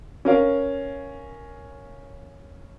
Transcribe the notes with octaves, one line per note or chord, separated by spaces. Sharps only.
C#4 A#4 F5